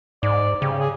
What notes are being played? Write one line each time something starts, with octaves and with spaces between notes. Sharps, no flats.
G#2 D5
C#3 G4
G#4